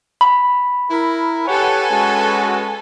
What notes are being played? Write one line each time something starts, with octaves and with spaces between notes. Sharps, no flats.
B5
E4 A#4
G4 A4 B4 C#5 F#5 G#5
G#3 C#4 F#4